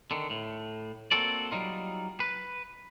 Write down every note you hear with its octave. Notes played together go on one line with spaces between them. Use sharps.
D3 D#3
A2
A#3 C4 F#4 A4 D5
F#3 G3 D#4 F4
B4